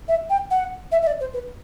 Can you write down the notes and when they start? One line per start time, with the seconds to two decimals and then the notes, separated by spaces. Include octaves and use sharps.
0.08 E5
0.30 G5
0.51 F#5
0.92 E5
1.02 E5
1.07 D5
1.20 C5
1.33 B4